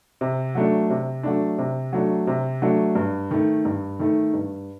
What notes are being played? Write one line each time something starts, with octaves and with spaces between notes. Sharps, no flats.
C3
F#3 A3 D4
C3
F#3 A3 D4
C3
F#3 A3 D4
C3
F#3 A3 D4
G2
D#3 A3
G2
D#3 A3
G2